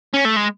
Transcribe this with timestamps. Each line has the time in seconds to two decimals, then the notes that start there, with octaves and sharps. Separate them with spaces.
0.14 C#4
0.25 A3
0.36 G#3